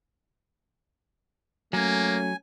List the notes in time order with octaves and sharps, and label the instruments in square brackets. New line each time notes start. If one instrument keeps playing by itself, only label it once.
[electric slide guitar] F#3 [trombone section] A3 C#4 [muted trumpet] A#3 [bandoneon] G#5